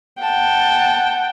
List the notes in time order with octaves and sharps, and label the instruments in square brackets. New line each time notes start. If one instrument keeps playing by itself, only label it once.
[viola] F#5 G5 [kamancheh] A5